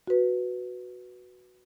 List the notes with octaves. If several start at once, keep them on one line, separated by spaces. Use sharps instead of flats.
F#4 B4